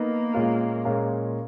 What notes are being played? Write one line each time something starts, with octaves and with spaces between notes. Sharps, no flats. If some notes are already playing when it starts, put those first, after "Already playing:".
Already playing: A#3 B3 D#4 A#4 D#5
A#2 G#3 C#4 F4 A#4
A#2 G#3 C#4 F4 A#4